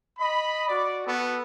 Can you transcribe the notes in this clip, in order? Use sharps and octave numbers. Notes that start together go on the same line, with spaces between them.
D#5 B5
F#4 D5
B3 F#4 A4